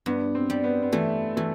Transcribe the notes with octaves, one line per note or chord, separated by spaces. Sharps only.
G2 B3
C4
G3
B3
B3
E3 A3
E3 A3